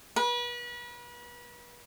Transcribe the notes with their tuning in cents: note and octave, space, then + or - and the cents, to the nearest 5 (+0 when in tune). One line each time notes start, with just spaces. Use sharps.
B4 -35